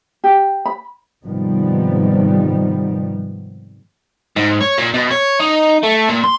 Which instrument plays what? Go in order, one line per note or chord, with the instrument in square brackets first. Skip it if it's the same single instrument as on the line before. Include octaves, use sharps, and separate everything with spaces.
[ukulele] G4
B5
[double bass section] G#2 C3 D#3 F3 G3 B3
[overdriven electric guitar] G#2
C#5
A#2
B2
C#5
D#4
A3
A#2
C6